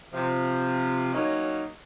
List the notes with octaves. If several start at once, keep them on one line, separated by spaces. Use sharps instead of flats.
C3 F3
F#3 A#3 C#4 D#4